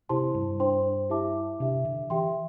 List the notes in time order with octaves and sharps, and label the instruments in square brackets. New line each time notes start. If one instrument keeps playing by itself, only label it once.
[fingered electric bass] C3 [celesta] E4 G4 C5 A5 C6
[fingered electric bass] G2
[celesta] D4 C5 G5 C6
E4 G4 E5 A5 D6
[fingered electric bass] C3 [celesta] D4 G4 E5
[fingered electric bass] D3
[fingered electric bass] E3 [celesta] G4 E5 G5 C6